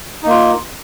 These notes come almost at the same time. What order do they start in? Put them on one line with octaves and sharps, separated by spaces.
D#4 A#3 F4